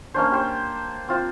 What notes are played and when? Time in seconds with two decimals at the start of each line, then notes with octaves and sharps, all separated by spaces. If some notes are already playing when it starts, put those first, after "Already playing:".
0.14 A#3 C#4 D4 C5
0.32 G4 C5
1.08 C4 F4